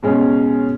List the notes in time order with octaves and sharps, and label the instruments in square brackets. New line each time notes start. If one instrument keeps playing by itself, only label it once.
[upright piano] B2 G#3 C#4